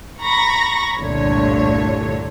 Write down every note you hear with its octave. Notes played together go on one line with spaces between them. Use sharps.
A#5 B5 C#6 A#6
G1 C2 A#2 D3 A3 C#5